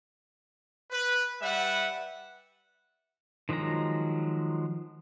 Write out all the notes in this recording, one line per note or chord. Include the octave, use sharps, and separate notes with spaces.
B4
G3 B4 E5 F#5
D#3 F3 F#3 G#3 A#5